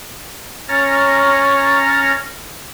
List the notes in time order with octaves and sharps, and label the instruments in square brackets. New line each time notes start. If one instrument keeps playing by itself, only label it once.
[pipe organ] C#4 C#5 A#5 F6 A6 A#6